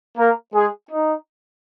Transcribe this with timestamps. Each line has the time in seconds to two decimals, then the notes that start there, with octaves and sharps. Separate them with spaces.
0.17 A#3 A#4
0.54 G#3 G#4
0.90 D#4